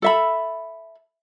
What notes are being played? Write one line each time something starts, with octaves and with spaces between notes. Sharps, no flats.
A4 E5 B5